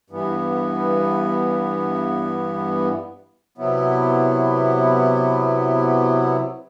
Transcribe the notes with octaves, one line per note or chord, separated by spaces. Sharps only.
G2 E3 B3
C3 F#3 B3 E4